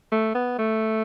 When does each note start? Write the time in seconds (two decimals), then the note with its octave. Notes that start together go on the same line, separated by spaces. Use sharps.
0.12 A3
0.35 B3
0.59 A3